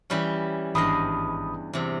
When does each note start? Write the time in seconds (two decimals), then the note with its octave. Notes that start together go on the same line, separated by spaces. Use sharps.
0.10 E3 G3 C#4
0.75 G#1 E2 G2 D#5 B5 D#6
1.73 E2 C3